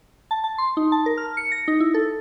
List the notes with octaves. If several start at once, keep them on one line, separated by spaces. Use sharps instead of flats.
A5
A5
C6
D#4
A5
A#4
F6
C#7
A#6
D#4
E4
A4